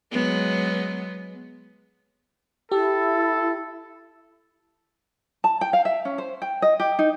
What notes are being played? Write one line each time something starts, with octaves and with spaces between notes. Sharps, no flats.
F#3 G#3 B3
E4 G4 A4
A5
G5
F5
E5
C#4
C5
G5
D#5
G4
D#4